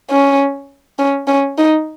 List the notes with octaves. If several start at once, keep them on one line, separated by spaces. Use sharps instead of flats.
C#4
C#4
C#4
D#4